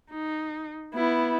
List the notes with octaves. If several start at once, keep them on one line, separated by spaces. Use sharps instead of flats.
D#4
B3 E4